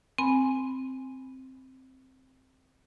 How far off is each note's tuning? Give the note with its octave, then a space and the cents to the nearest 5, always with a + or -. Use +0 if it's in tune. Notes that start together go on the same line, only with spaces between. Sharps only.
C4 +0 G#5 +0 B5 +0